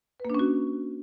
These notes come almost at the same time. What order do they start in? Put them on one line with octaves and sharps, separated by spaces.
B4 A#3 D4 C#4 F#4